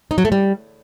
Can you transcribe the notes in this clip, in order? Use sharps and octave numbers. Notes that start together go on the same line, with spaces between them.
D#4
F#3
A3
G3